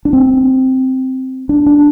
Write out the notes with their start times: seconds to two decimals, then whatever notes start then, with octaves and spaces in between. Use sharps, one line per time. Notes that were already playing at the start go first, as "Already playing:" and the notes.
0.05 D4
0.13 C4
1.49 D4
1.66 D4